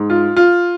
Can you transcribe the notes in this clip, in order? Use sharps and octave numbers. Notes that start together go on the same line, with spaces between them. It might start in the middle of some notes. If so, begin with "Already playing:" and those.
Already playing: G#2
F4
F4